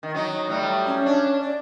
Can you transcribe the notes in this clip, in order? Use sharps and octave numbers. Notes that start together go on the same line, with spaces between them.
D#3
F#3 D#4
A2 F#3 G3
C#4
D4
D5